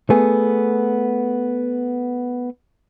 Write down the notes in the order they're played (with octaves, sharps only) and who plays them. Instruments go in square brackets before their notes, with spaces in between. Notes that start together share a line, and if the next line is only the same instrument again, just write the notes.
[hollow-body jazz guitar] A3 B3 G#4